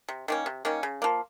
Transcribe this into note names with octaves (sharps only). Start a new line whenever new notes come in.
C3
D#3 A#3 C#4
C3
D#3 A#3 C#4
C#3
F3 A#3